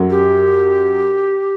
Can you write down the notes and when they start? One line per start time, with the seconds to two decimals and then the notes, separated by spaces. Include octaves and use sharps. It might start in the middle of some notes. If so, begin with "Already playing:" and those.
Already playing: F#2 F#3
0.10 G4